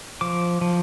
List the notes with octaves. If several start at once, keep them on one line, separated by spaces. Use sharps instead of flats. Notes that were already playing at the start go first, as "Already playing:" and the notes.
F3 D6
F3